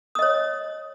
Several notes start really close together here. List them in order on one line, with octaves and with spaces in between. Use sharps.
D#6 D#5 C#5